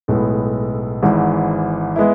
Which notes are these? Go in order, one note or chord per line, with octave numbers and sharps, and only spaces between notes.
B1 A2 G#3 B3
G#1 G#2 E3
G#3 B3 E4